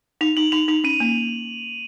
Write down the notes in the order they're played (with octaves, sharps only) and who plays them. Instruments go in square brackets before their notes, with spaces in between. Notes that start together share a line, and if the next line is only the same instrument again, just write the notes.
[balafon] D#4 [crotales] F7
[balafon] D#4 [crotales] F#7
[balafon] D#4 [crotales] F7
[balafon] D#4 [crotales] F7
[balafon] C#4 [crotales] D#7
[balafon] A#3